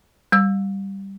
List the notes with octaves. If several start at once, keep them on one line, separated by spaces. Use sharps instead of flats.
G3 E6